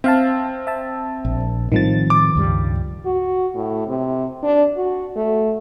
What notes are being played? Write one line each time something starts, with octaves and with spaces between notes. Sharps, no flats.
C4 E5 F5 A5
E5 A5
A#1
A2 D#3 F3 G3 C4 A6
D6
C#2 G2 G3
F#4
A2
C3
D4
F#4
A3